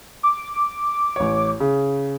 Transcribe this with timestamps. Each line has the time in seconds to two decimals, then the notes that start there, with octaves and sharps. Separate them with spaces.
0.23 D6
1.16 A1 C#5
1.60 C#3